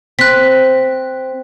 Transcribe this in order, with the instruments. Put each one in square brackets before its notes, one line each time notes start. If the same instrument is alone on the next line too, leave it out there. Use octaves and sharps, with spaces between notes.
[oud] C4 [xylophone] F#6 B6